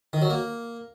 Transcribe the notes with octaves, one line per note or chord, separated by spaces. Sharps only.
D#3
F#3
A#3